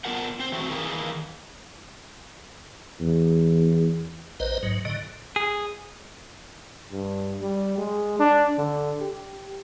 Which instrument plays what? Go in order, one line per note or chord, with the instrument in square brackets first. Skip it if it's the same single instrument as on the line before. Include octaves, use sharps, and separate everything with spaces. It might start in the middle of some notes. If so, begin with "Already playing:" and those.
[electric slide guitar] B3 D4 F4 A#4 F#5
C4 C5
E3 F#3 A3 B3 C4 F#4
D#3 E3 A#3 G#4
[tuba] E2
[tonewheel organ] A#1 B4 C5 D#5
G#2 F#3
A2 D3 D#5
[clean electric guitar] G#4
[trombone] G2
G3
G#3
D4
D3
G4